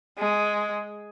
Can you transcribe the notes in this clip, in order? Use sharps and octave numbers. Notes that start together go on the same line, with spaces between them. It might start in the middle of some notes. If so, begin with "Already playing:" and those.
G#3